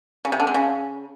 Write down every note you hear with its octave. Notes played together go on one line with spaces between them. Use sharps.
C#3
C3
D3
G#3
C#3